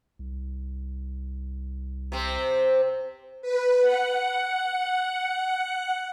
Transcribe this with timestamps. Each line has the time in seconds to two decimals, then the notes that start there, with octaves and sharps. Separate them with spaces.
0.19 C2
2.12 C3 C4
3.42 B4
3.81 F#5